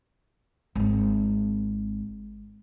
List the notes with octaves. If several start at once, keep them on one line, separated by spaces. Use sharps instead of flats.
G#1 C4